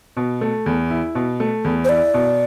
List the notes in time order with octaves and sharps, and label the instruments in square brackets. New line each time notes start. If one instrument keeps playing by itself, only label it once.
[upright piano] B2
A3
E2
E4
B2
A3
E2
[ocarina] C5
[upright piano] E4 [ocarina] D5
[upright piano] B2